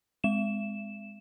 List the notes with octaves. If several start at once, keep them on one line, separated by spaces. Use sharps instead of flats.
G#3 E7